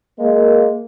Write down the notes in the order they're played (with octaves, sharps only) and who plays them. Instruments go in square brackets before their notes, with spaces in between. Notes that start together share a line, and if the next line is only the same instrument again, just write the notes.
[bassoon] G#3 [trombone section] A#3